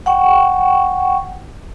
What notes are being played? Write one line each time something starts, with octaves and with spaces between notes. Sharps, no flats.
F#5 G5 C#6